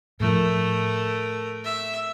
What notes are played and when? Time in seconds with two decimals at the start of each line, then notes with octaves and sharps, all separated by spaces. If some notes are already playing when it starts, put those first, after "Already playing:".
0.20 A2 F3 A3 A#4
1.64 E5